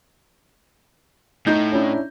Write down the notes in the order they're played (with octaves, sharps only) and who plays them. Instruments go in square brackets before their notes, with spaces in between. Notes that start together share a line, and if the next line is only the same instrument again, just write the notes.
[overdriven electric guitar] A2 [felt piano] D#4 [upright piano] G6
[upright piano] C#4 D4 E4